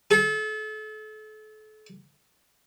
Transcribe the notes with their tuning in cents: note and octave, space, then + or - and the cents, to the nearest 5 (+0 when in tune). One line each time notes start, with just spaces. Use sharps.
A4 -35